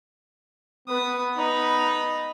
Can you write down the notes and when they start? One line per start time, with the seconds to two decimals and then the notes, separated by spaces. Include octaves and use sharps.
0.88 B3 B4 D#6
1.36 D#4 D#5 B5